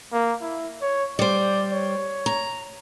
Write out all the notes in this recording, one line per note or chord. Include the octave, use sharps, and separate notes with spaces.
A#3
E4
C#5
G3 C5 D5
C#5
A#5